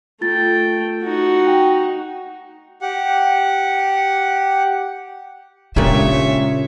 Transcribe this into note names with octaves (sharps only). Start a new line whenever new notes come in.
A3 F4 G5 A6
D#4 F#4
G5
G4 F#5
A#2 C#3 G#3 C#4 D4 G4 C#5 E5